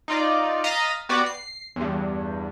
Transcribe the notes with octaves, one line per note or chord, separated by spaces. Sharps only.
D#4 F4 D5
D#5 F5 A#5 A6 B6 D#7
B3 F#4 G4 B4 D5
C7
E2 G2